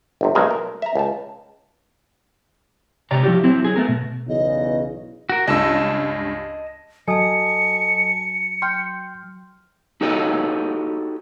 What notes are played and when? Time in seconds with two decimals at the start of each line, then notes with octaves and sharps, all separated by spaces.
0.21 G1 C3
0.35 B1 G#3 A3 G#4 A#4
0.51 A#4
0.82 E5 A#5
0.95 C#2 A5
3.11 C3 G4 C#5 D5 A#5
3.23 F3 E4 F#4 G4
3.43 F#3 C4 E4
3.65 F#3 G#4
3.76 A3 B3 A#4
3.89 B2
4.28 B1 E2 C#3 D#5
5.29 F#4 A#4
5.48 C#2 G2 D#5 A5 E6
7.08 F#3 A4 D#5 G#5 A5 D#6 C#7
8.62 G5 C6 F6 G6
10.01 D#4 F#4 G4 A4 C#5 D#5